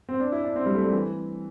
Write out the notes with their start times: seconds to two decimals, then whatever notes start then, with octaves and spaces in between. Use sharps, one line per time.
0.09 C4
0.20 D4
0.32 E4
0.44 D4
0.56 C4
0.66 G3
0.75 A3
0.84 G3
0.92 E3